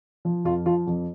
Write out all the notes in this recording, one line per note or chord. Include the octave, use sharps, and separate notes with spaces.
F3
F2 F4
F3 F4
F2